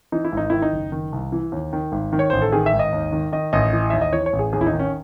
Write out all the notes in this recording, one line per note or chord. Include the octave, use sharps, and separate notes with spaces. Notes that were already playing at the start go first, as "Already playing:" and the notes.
E3 D#4
E4
G#1 D#4
D#3 E4
D#4
F#1
D#3
C2
E3
D#2
D#3
G#1
D#3
C#5
A1 C5
A4
D#3 G#4
E5
G#1
D#5
D#2
D#3
D#3 D#5
A1 D#5
E3
D#2 E5
D#5
E3 C#5
C#5
A1
G#4
D#2 G#4
E4
D#4
D#3
C#4